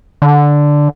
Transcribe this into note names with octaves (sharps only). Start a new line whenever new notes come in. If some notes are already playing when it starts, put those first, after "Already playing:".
D3